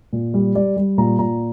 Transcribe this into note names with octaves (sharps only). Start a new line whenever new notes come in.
A#2
G3
G3 D5
G3
A#2 A#5
A#2 A#5